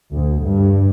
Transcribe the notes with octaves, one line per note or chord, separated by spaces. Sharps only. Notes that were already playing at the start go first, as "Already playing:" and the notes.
D2
G2